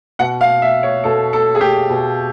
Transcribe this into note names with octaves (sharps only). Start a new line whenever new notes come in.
B2 F#5
F5
E5
C#5
B2 A4
A4
G#4
G4
B2